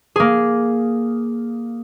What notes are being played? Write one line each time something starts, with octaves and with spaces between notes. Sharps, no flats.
A#3 G#4